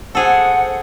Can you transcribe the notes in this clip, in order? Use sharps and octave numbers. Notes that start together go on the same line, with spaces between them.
G#4 A4 C5 F#5